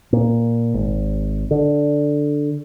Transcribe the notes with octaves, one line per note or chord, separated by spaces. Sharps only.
A#2
G#1
D3